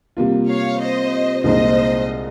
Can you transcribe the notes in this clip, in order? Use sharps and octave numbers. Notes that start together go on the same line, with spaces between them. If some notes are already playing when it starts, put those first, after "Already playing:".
C3 G3 A#3 F4
C#5 F5
C5 D#5
C2 A#2 G#3 D#4 C5 D#5